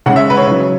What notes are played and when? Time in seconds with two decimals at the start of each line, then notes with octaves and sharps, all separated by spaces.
0.06 C#3 G#3 F#5
0.16 E5
0.30 B4
0.37 C#5
0.46 C#3 F#3